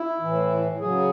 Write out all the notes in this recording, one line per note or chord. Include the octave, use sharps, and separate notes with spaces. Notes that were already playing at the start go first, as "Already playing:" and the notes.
Already playing: E4
A2 E3
C#3 F#3 G#4